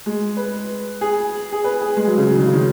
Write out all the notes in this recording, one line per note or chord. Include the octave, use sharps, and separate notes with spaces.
G#3
B4
G#4
G#4
B4
G#4
G#3
F#3
C#3
F#3
D#3
C#3
D#3